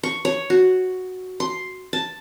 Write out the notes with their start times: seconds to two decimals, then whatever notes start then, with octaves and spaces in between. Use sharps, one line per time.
0.03 C#6
0.25 C#5
0.50 F#4
1.40 C6
1.93 A5